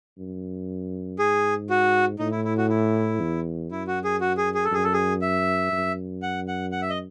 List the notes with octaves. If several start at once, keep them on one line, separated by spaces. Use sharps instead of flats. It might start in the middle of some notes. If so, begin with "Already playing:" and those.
F#2
G#2 G#4
F#4
A2 D#4
E4
E4
F#4
E4
E2
F#2 E4
F#4
G#4
F#4
G#4
G#4
A4
F#2 G#4
A4
G#4
E5
F#2
F#5
F#5
F#5
E5
D#5